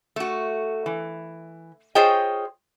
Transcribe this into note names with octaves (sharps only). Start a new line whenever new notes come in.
A3 F#4
E3
F4 G#4 C5 C#5 D#5 G5